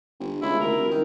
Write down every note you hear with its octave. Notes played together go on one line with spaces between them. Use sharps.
G1
C#2 E4
D2 A#4
C2
D#3